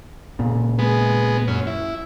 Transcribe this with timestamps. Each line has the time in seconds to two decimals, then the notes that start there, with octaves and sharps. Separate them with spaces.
0.39 A#2 C#3
0.79 G#3 B3
1.48 F#2 C#4
1.67 E4